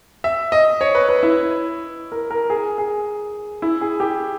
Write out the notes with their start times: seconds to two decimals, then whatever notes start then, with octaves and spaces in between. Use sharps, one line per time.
0.24 E5
0.52 D#5
0.81 C#5
0.95 B4
1.09 B4
1.23 E4
2.12 A#4
2.31 A#4
2.50 G#4
2.78 G#4
3.62 E4
3.81 G#4
4.00 G4